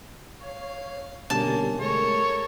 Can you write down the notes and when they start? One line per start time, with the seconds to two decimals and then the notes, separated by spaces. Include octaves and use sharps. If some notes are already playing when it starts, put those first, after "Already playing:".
0.41 C#5 F5
1.30 B2 D3 G3 A#3 C#4 A5
1.80 G#3 A3 A4 A#4 C#5